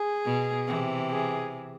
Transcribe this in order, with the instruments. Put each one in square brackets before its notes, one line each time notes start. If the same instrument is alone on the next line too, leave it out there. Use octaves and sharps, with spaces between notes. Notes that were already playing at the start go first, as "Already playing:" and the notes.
Already playing: [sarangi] G#4
[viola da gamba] B2
C3 E3
[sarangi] G#4